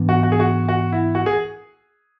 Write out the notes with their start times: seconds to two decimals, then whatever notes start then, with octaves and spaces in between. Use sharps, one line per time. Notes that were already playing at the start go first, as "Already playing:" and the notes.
Already playing: G#2 E3 B3 D4
0.09 F#4
0.23 F#4
0.32 G#4
0.40 F#4
0.69 F#4
0.92 E4
1.15 F#4
1.26 G#4